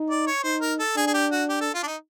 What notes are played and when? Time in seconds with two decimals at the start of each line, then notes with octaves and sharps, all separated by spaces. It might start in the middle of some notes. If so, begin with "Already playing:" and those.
Already playing: D#4
0.10 D5
0.27 C#5
0.44 D#4 C5
0.61 A#4
0.79 A4
0.96 D4 G#4
1.07 G#4
1.14 G4
1.32 F#4
1.49 G4
1.61 A4
1.74 F4
1.83 D4
1.87 D#4